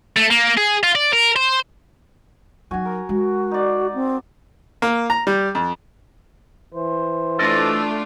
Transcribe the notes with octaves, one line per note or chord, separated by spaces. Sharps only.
A3
A#3
G#4
F4
D5
A#4
C5
F#3 D#4 F#4 G#5
A#4 D#6
G#3 F#4
D#4 D5
C4
A#3
A#5
G3
F2
E3 C5
A3 D4 F4 A4 D5 D#5